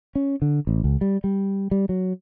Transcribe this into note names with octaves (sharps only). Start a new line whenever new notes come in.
C#4
D3
A1
C#2
G3
G3
G3
F#3